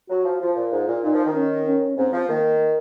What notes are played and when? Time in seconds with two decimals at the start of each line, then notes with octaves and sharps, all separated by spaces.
0.09 F#3 F#4
0.25 F3
0.41 F3 F4
0.56 A#2
0.72 G#2
0.87 A#2
1.04 A#2 D#4
1.14 F3
1.25 D#3
1.34 C#4
1.66 C#4
1.97 G#2 C4
2.13 F3
2.29 D#3 A#3